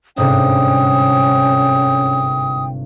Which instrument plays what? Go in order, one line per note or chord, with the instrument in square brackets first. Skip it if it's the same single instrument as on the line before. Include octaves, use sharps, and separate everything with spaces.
[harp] G1 G#2 C3 [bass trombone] C#4 [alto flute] G5 [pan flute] D#6